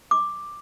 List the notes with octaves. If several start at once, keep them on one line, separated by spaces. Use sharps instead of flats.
D6